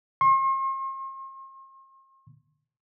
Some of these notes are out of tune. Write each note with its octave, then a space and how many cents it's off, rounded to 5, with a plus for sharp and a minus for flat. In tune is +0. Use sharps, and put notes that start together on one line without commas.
C6 +45